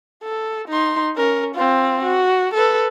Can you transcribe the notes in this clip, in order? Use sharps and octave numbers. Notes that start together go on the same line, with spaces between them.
A4
D#4 C6
C#4 A#4
C4 F4
F#4
A4 B4